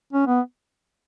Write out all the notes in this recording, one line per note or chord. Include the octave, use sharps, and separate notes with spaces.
C#4
B3